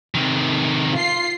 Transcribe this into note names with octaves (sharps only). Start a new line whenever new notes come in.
C3 D#3
F4 C7